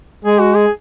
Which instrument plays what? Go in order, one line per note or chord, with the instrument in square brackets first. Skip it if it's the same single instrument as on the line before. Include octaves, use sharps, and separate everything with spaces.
[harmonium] G#3 [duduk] G#4
[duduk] F#4
G#4